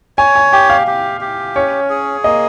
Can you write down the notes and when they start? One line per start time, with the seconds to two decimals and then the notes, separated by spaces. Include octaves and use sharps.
0.18 C#5 G#5
0.35 G#5
0.52 G4 G5
0.70 F5
0.87 G4
1.21 G4
1.55 C#4 C#5
1.90 G#4
2.24 A#3 D#5